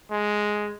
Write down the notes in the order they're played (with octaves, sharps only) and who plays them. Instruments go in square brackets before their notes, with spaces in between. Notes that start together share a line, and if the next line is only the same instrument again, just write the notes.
[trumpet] G#3